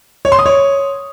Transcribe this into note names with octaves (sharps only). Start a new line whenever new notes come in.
C#5
C6
D#6
C#5